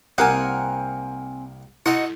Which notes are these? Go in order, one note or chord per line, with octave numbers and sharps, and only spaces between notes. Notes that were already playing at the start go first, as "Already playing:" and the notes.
C2 A#3 C4 A#4 F#5 G#5 D#6
D#4 E4 F#4 A4 D#5 F#5